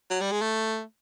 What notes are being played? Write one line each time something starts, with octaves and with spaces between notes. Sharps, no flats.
F#3
G3
G#3
A3